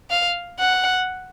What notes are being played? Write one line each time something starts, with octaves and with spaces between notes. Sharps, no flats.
F5
F#5